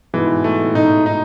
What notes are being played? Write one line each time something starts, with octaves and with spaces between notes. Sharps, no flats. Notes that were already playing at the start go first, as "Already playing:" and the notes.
G#2 B2 E3
A3
A2
G#2 B2 D#4
D#4